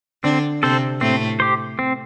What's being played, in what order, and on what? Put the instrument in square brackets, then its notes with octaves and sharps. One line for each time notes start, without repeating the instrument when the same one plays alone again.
[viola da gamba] D3 D4 [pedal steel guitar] C4
[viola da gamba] C3 C4 [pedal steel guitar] A4 C5
[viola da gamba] A2 A3 [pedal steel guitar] C4
[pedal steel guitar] G4 C5
C4